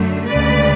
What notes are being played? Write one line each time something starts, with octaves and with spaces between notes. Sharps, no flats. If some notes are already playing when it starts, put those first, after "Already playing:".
Already playing: F#2 D3 F#3 A3
D2 C#3 G#3 B4 D5